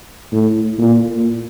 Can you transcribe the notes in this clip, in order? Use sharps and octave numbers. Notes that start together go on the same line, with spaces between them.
A2
A#2